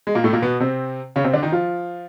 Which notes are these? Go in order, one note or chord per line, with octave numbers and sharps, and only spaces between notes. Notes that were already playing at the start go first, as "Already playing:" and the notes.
G#3
A#2 A#3
A2 A3
A#2 A#3
B2 B3
C3 C4
C#3 C#4
C3 C4
D3 D4
D#3 D#4
F3 F4